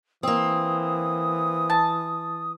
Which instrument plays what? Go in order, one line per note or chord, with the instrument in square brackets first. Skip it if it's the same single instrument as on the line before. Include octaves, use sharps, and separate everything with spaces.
[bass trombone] E3 [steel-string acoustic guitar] A#3 C4 [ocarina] D#6
[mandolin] A5